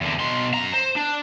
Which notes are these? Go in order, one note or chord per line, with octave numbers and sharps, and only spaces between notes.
E2 D3
B2 C6
F#2 A#5
C5
D4